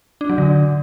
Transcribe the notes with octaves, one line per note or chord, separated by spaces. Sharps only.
D4
F#3
D3